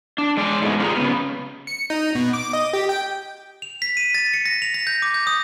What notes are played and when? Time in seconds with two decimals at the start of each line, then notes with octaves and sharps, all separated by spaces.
0.18 D4
0.37 G#3 D5
0.62 G#2 B2 G#3 A3
0.79 G#3 C#4 F4 G4 G#4 A#5
0.97 C#3 B3
1.67 C#7
1.90 D#4
2.15 B2
2.33 D6
2.53 D#5
2.73 G4
2.89 G5
3.62 F7
3.82 B6
3.97 D#7
4.14 A6
4.34 C#7
4.46 A#6
4.62 F7
4.74 A#6
4.87 G6
5.02 D6
5.14 G6
5.27 D#6